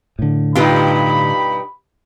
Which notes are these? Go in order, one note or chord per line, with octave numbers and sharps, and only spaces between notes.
A2 D3
G2 B2 D#4 F4 G4 B4 B5